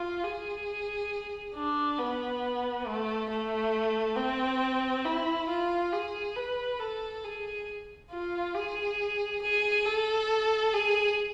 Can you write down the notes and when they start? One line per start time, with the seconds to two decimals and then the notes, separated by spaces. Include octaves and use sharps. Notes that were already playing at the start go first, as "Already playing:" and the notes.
Already playing: F4
0.24 G#4
1.55 D4
1.99 B3
2.87 A3
3.30 A3
4.17 C4
5.05 E4
5.49 F4
5.93 G#4
6.37 B4
6.80 A4
7.24 G#4
8.11 F4
8.55 G#4
9.42 G#4
9.86 A4
10.74 G#4